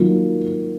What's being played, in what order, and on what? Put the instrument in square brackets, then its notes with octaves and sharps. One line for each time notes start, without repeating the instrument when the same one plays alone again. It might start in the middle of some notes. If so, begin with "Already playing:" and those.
Already playing: [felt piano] D#3 F#3 A#3 F4